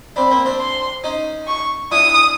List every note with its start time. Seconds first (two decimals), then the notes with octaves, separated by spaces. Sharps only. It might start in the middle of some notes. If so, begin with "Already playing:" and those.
0.16 C4 D4 B5
0.30 A#3 C4
0.45 C4 D4
0.60 C6
1.04 C#4 D#4
1.47 C#6
1.92 D4 E4 D#6